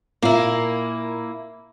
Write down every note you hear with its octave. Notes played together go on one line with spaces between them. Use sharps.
A#2 A#3 E4